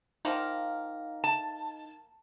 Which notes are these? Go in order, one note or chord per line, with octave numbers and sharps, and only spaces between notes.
D#3 F3 A#3 D#4
A5